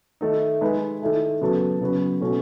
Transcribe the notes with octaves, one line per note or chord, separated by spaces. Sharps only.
D#3 A3 D#4
G#3 D#4 G#4 B4
D#3 A3 E4 A4
C#3 F#3 B3 F#4 A4
C#3 F#3 B3 F#4 B4
B2 A3 C#4 F#4